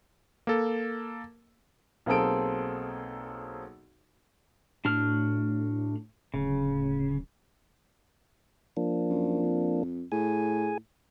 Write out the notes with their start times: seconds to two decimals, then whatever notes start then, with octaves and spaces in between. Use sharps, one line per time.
0.47 A#3 A4
2.06 B1 A#3 C4 G#4 A4 D7
4.85 A2 D4 F#4 F6
6.34 D1 C#3
8.77 F3 A#3 D4
9.10 F#2
9.42 F2
10.12 A2 G#4 G#5